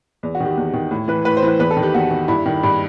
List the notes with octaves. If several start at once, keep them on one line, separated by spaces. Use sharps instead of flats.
E2
F#4
D#3 G4
E2
D#3
A2
E3 B4
A2 B4
C5
E3
B4
E2 B4
A4
D#3
G4
E2 F#4
D#3
G2 E4
D#3
G2